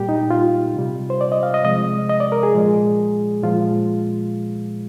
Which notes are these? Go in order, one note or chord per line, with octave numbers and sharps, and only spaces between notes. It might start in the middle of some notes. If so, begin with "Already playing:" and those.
Already playing: A#2 G3 G4
D#4
F4
C3 G3
C5
D5
D#5
F5
D#5
C3 F3 G#3 D#5
D#5
D5
A#4
G#4
A#2 F3 G#3
A#2 F3 G#3 F4